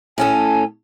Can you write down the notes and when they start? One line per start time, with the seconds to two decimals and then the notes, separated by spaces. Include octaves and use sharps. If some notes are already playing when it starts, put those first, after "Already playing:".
0.18 A2 C#4 A4 G#5